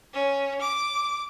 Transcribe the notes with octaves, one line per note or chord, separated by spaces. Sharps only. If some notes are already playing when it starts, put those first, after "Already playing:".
C#4
D6